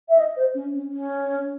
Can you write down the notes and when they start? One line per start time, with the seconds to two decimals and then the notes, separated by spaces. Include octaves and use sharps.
0.09 E5
0.18 D#5
0.37 C5
0.55 C#4
0.74 C#4
0.92 C#4